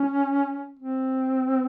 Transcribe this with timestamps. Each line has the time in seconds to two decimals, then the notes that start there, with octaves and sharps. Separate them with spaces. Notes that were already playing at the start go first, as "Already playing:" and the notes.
Already playing: C#4
0.79 C4